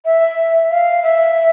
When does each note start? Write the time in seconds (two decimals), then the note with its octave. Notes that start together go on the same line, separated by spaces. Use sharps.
0.05 E5
0.71 F5
1.03 E5